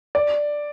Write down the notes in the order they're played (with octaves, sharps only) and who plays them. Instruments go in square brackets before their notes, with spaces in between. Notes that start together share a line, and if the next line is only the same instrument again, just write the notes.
[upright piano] D5